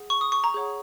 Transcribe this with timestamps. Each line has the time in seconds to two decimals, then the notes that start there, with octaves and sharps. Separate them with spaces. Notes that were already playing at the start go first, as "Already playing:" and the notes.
Already playing: G#4 F#5
0.10 C#6
0.21 D#6
0.32 C#6
0.44 A#5
0.54 G#4 C#5 F#5